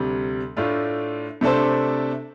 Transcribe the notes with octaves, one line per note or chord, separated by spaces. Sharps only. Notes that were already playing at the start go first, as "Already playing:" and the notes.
Already playing: D2 C3 G3
A2 A3 D4 F4
C3 A3 D4 A4 C5